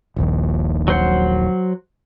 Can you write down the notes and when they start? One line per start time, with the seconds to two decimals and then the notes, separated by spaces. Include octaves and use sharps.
0.16 D#1 A#1 D#2
0.88 F#3 C5 F#5